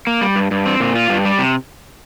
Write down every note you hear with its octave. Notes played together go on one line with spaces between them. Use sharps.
A#3
G3
G2
G2
C4
A#2
F4
G2
G3
C3